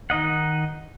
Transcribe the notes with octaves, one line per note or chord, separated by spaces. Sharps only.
D#3 D#4 D#5 F#5